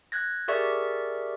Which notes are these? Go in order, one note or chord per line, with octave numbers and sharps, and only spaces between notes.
F#6 G#6 A#6
G4 G#4 A#4 D5 E5 C#6